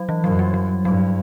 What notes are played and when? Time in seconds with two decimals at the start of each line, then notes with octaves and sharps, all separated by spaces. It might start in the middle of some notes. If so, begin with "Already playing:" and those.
Already playing: F#3
0.09 E3
0.24 F#2 F#3
0.39 G3
0.54 F#3
0.85 G2 F#3